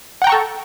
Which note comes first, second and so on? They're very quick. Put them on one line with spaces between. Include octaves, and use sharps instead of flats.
F#5 G5 A#5 C#6 A4